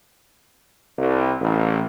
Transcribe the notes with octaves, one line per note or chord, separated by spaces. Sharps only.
C2
A1